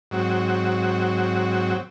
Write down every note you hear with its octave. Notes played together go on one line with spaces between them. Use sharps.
G#2 F#3 C4 F#4